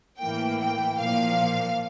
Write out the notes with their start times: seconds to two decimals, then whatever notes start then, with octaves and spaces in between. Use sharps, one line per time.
0.19 A2 E3 A#3 G5
0.60 G5
0.99 A#2 F3 A#3 F5